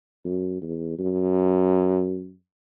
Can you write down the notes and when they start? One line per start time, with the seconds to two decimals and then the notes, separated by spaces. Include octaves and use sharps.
0.25 F#2
0.62 E2
0.99 F#2